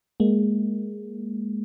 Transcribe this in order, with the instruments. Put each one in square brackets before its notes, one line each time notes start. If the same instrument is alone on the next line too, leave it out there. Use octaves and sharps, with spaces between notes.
[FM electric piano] G#3 A#3